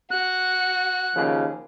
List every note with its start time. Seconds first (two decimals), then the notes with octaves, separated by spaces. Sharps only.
0.11 F#4 F#6
1.15 D#2 C#3 F3